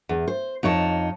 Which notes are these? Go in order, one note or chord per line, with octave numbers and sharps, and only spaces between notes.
E2
C5
F2 D#4 C#5 A5